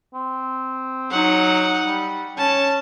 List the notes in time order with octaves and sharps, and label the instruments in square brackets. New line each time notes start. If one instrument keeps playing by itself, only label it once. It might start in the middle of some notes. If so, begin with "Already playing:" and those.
[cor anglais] C4
[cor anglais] F#3 [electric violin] D#4 F#5
[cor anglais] G3
[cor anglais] C#4 [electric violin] A5